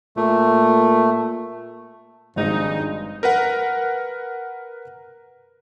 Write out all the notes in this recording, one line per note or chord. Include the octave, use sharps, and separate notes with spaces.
A#2 A3
G#1 G2 G#3 D#4 A#6
A#4 B4 F#5